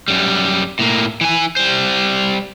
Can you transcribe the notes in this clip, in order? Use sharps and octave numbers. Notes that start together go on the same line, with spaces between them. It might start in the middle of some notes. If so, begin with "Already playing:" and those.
F#2 G3
A2 A#3
E3 G#5
G3 C5